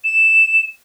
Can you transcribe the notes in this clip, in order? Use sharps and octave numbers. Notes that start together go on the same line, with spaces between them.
E7